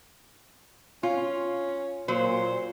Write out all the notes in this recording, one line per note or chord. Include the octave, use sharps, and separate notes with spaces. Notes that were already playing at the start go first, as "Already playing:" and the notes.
C#4 F4
A#2 F#3 C5